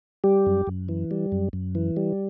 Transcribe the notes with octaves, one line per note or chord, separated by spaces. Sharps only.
G3 G4
F#2
F#2
E3
G3
F#2
F#2
E3
G3